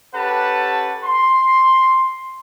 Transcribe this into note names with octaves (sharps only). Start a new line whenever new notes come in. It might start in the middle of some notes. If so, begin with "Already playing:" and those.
C#4 G4 A4 B4 F#5 A5
C6